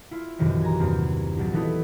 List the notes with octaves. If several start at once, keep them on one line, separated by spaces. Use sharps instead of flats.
E4 F4
A#1 F#2 C3 D#3 E3
G#5 A#5
E2 G2 A#3 C4
A#1 F#3 A6
E3 A3 B3 D#4 E4